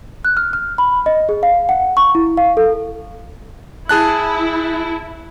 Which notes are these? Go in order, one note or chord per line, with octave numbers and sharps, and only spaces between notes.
F#6
F6
F6
B5
D#5
G#4
F5
F#5
C#6
E4
F5
A4
E4 G#4 A5 F#6